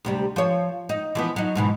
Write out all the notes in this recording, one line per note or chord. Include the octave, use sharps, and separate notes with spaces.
D2 C3 G3
F3 C#5
D#4
E3 F3 B3
F#3 D#4
G#2 B2 E3